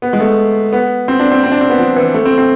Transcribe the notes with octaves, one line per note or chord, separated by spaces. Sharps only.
B3
G#3
A3
B3
C4
D4
C4
C4
D4
C4
B3
F3
E3
A3
C4
C4